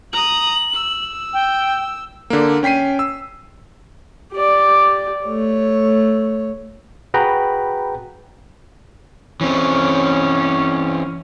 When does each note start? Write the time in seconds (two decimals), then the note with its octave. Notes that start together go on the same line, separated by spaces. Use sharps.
0.13 A#5 D#6 F#7
0.74 E6
1.33 G5
2.30 D3 A#3
2.63 C#4 G5 B6 C7 D#7
2.99 E6
4.33 G4 D5
5.25 A3 C#5
7.14 F#4 G#4 B4 G5 A#5 B5
9.41 E3 C4 C#4